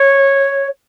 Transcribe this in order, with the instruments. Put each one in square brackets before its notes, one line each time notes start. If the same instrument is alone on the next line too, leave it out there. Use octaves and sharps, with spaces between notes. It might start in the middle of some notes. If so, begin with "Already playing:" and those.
Already playing: [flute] C#5